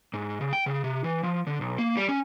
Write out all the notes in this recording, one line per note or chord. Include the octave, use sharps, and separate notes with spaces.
G#2
C#3
G5
C#3
C3
E3
F3
D3
B1
A#3
G3
C#4